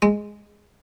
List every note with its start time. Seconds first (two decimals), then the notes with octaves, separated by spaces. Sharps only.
0.02 G#3